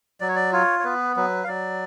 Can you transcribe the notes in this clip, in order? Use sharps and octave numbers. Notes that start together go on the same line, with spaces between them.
F#3 D5
C#5
D5
F4 C#5
C#5
B3 B4
F#3 B4
F5
F#3 D5